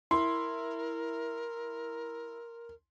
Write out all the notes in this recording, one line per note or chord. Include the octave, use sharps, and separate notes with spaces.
E4 A#4 C6